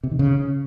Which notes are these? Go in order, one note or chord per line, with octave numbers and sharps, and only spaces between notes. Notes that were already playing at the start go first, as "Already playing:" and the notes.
C3
D#3
C#3